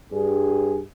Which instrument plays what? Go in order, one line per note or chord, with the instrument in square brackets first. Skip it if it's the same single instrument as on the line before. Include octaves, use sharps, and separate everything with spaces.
[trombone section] G2 G#4